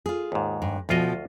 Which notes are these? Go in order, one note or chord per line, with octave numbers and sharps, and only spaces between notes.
F4 G#4
D#2 G#2
G2
D2 B2 F3 F4 D#5